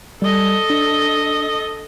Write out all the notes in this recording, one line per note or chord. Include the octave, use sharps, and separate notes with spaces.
G3 A4 D#5
D4